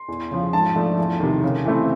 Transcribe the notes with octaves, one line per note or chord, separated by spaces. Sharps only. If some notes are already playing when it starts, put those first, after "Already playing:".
Already playing: C6
E2
C#3 F3
G#2 A5
F3 A3 D4
E2
C3 D#3
C#3
E3 A3 C4